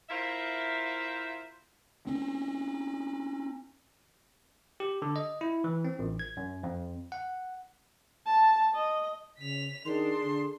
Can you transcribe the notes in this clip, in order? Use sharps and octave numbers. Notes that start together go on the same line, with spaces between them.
E4 F4 A#4 C5 E5 F5
C4 C#4
G4
D3
D#5
E4
E3
C4
A1
G#6
F#2
F2
F#5
A5
D#5
C#3 B6 F7
D#3 D4 G#4 C6
D3